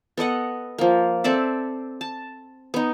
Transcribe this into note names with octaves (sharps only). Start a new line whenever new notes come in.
B3 A4 D#5 F#5
F3 A#3
C4 A4 D5 E5
A5
B3 D#4